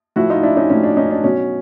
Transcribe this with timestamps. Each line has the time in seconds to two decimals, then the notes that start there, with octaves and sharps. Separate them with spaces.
0.16 A2 F3 E4 F#4
0.30 D#4 F4
0.43 D4 E4
0.57 C#4 D#4
0.70 A2 F3 C#4
0.83 D4
0.97 C#4 D#4
1.11 D4
1.24 B2 F#3 C#4